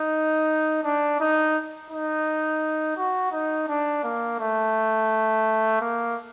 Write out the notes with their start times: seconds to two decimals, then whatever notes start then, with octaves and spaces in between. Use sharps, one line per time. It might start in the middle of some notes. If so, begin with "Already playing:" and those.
Already playing: D#4
0.83 D4
1.20 D#4
1.91 D#4
2.97 F#4
3.32 D#4
3.68 D4
4.04 A#3
4.40 A3
5.81 A#3